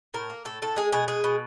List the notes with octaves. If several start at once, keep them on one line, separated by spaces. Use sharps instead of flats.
A2 A#4
A#3
A2 A4
A2 A4
G#3 G#4
B2 G#4
G#3 G#4
B2